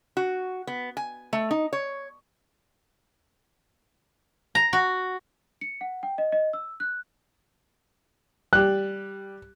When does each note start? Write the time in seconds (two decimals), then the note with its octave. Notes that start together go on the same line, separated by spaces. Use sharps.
0.17 F#4
0.67 B3
0.97 G#5
1.33 A3
1.51 D#4
1.73 C#5
4.55 A#5
4.73 F#4
5.61 C#7
5.81 F#5
6.03 G5
6.18 D#5
6.32 D#5
6.53 E6
6.80 F#6
8.53 G3 G4 F#6